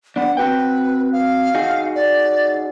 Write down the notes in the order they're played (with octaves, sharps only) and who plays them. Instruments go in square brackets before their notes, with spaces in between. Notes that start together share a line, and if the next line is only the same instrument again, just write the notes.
[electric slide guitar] B3 D4 [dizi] F#5
[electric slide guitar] C4 F#4 G5 [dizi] B4
[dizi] F5
[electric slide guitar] D#4 F#4 G#4
[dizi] D5